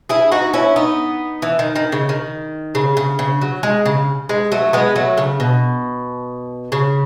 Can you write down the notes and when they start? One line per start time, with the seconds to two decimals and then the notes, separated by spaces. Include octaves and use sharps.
0.09 E4 G#4
0.31 D#4 F#4
0.53 C#4 E4
0.76 B3 D#4
1.42 E3
1.59 D#3
1.76 D#3
1.92 C#3
2.09 D#3
2.75 C#3
2.97 C#3
3.19 C#3
3.41 F#3
3.63 G#3
3.85 C#3
4.29 G#3
4.52 F#3 A3
4.73 G#3 B3
4.96 F#3 A3
5.17 C#3
5.40 B2
6.72 C#3